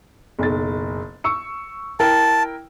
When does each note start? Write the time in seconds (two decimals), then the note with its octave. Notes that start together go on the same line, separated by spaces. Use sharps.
0.39 F#1 B1 A6
1.24 C#6 E6 C#7
2.00 E4 A#4 G5 A5